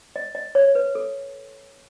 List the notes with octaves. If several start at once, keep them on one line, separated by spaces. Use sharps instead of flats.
D#5
D#5
C#5
B4
A4